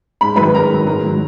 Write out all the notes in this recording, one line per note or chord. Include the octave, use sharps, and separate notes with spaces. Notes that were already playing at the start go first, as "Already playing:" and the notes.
G#2 B5
D#3 F#3 B4 B5
G#2 A#4 A#5
D#3 F#3
G#2 A#4 A#5
D#3 F#3